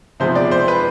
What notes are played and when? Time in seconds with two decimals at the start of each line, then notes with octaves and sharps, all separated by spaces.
0.20 C3 F3 G#3 B3 C5
0.35 D5
0.51 C5
0.68 B4